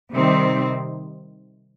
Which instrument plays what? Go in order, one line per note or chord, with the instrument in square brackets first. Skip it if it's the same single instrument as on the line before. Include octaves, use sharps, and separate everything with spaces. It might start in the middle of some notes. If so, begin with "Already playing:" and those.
[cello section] C3 D#3 G3 C4